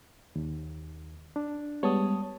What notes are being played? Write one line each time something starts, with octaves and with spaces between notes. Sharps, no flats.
D#2
D4
G3 G#3 B3 C#5 A5 D#6